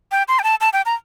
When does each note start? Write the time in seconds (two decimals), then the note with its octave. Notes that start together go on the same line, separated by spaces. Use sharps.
0.12 G5
0.28 C6
0.39 G5
0.44 A5
0.61 A5
0.73 G5
0.86 A#5